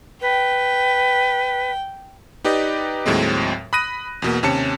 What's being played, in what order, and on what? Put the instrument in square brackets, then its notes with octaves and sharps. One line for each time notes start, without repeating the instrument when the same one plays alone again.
[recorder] B4 [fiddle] G5
[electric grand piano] D#4 G4 B4 D5 D#5
D#2 A2 F#3 G#3 C4
B5 D#6 F#6 A#6 D#7
E2 B2 A#3
D#2 C3 C#4 A5 C#7